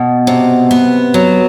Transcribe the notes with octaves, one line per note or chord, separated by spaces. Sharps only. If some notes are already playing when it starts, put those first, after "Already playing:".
Already playing: B2
C3
B3
F#3